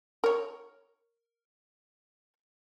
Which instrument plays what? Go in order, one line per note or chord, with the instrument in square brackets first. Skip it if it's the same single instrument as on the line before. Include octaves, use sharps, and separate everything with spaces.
[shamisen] A#4 C#5